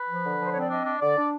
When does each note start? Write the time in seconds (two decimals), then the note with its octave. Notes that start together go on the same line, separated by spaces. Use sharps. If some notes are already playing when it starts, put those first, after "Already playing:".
Already playing: B4
0.09 F3
0.25 D3
0.40 F3 C5
0.52 C4 C#5
0.61 D5
0.70 D4 D#5
0.86 D4
1.01 D3 D5
1.17 D4